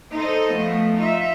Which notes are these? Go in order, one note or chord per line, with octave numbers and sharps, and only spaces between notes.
D#4 A4 C5 D#5
F3 A3 B3
D#4 F4 E5